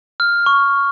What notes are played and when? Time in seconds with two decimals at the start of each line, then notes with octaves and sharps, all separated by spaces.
0.20 F6
0.46 C#6